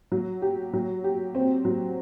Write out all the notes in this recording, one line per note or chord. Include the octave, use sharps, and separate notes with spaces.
F#3
G4
F#3
G4
C4
F#3